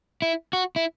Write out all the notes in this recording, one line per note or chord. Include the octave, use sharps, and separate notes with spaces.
E4
F#4
E4